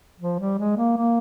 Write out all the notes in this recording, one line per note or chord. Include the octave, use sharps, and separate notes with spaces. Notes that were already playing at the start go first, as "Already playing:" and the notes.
F3
G3
G#3
A#3
A#3